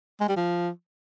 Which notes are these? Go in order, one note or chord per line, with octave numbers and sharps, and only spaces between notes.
G#3
G3
F3